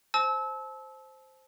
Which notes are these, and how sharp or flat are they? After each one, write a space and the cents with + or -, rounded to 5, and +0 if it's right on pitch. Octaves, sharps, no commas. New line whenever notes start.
C5 +0 A5 -35 E6 -25